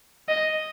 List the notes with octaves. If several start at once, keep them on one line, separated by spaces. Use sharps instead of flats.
D#5